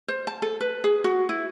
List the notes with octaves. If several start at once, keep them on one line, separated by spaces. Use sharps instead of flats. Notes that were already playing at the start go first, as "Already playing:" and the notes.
C5
A5
A4
B4
G#4
F#4
E4